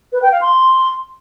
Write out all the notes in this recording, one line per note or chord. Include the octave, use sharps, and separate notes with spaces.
B4
G5
F5
C6